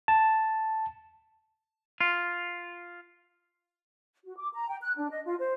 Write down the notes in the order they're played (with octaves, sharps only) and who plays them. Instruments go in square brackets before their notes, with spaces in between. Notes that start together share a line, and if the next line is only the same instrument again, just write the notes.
[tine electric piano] A5
[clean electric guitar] F4
[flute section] F#4
D6
A#5
G5
F#6
D4
D#5
F4
C5